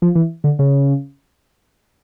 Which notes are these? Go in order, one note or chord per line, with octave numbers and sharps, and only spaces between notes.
F3
E3
D3
C#3